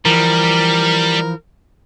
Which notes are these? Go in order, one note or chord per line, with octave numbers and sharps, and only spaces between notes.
E3 F3 G3 A#4